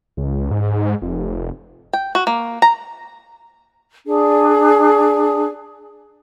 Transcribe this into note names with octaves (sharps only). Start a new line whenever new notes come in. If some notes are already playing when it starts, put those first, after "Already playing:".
C#2
G#2
F1
G5
F#4
A#3
A#5
D4 G#4